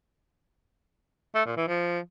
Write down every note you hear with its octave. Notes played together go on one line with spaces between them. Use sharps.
A3
A#2
E3
F3